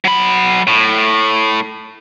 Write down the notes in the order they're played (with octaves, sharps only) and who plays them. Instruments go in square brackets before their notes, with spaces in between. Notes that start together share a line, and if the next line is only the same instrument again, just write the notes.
[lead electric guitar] F#3 B5
A2